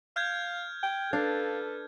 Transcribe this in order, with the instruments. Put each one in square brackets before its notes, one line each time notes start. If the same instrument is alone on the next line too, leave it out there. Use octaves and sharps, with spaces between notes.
[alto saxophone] F5 [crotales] F6 G6 G#6
[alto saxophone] G5
[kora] D4 [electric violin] A4 B4 [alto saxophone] F5